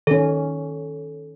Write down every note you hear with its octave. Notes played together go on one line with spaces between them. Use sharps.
D#3 C#4 A4